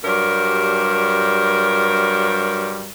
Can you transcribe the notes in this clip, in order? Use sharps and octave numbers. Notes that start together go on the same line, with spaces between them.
G2 F#3 G3 A#4